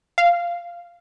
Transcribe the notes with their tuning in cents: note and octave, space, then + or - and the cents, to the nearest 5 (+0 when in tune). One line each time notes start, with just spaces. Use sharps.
F5 -10